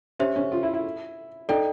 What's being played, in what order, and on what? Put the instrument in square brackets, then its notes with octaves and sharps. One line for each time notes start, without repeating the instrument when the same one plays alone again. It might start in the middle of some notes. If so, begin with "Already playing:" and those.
[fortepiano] C#4 [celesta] G4 C5 E5
[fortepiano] C#4
F4
E4
E4
[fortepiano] D#4 [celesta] A4 D5 G5